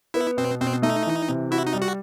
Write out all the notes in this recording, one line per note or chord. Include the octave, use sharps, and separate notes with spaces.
B3 E4
B2 C4
B2 C4
A3 D#4
E3
C3
E4 F#4
D#4
G3
F#4